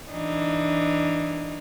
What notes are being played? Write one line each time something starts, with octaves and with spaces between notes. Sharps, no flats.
E3 D4 D#4